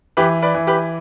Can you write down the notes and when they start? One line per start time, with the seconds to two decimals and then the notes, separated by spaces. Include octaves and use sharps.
0.17 E3 G4 B4
0.42 B4 D5
0.54 E3
0.67 G4 B4